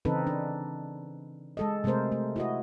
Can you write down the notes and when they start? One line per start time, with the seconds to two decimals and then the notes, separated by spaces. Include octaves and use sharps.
0.05 C#3 E3 C4 D#4 A4 B4
0.27 D4
1.57 G#3 A4 D#5
1.84 C3 G#3 A3 A#4 C5
2.12 A3
2.36 E4 F#4 D#5